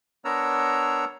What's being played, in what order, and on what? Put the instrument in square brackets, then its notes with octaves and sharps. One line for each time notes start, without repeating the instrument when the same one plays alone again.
[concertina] B3 D4 A#4 C#5 A#5 E6